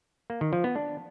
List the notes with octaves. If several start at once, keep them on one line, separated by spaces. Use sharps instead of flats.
A#3
D#3
F3
B3
D4